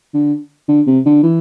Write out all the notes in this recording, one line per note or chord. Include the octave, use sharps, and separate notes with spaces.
D3
D3
C3
D3
E3